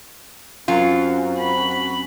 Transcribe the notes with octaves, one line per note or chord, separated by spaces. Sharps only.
F#2 C4 F4 F#4
B5